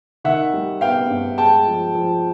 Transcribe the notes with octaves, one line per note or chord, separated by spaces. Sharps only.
D#3 E5 F#5
G3
B3 F5 G5
G2
G#3 G5 A5
F3
F3